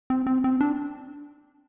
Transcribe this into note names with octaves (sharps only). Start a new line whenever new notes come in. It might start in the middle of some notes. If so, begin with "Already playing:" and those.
C4
C4
C4
D4